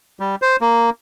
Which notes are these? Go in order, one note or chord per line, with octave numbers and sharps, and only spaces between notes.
G3
C5
A#3